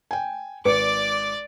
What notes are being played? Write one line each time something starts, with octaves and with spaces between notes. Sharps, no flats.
G5 G#5
G#1 B4 D5 D6 C#7